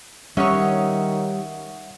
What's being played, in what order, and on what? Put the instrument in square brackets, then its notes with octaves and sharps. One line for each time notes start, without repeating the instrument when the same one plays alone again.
[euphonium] D#3 [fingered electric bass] G3 [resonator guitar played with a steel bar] C#4 D#4 C#5 [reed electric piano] E5 F#5 D#6